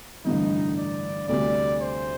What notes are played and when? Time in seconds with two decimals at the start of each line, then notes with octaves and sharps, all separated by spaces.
0.25 A1 G2 D3 D#4
0.77 D5
1.29 D2 C3 G3 D5
1.81 C5